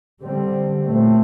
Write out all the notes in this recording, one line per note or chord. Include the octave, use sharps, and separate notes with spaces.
D3 G3 C4
A#2 A3 C4